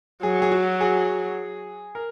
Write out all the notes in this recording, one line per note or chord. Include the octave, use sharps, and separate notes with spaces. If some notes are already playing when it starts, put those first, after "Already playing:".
F#3 G#4
G#4
F#4
G#4
A#4